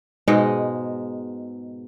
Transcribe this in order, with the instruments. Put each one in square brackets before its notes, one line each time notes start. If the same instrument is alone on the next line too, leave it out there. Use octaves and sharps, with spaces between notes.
[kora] G#2 B2 G#3 D#4